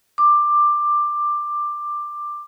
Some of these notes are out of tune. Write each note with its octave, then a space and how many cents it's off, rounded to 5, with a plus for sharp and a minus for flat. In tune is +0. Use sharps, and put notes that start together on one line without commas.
D6 +15